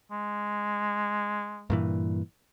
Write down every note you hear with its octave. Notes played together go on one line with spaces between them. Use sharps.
G#3
G2 A#2 E3